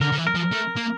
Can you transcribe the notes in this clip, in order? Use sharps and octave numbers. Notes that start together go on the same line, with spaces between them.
D3 A#4
D3
E3
A#4
F3
A#4
A3
A#3